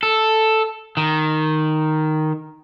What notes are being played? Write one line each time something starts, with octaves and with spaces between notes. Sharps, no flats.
A4
D#3